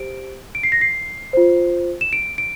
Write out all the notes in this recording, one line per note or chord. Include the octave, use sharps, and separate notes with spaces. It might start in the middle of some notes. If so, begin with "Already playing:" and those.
Already playing: G4 C5 D7
D7
C7
A#6
C7
F4 C5
E7
D7
D7